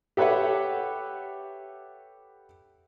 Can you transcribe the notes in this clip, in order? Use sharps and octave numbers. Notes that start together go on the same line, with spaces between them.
G4 A4 B4 C#5 E5 F#5